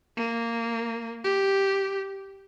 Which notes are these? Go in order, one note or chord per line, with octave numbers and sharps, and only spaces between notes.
A#3
G4